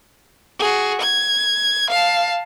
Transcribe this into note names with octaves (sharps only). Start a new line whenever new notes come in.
F#4 G#4
G#6
F5 A5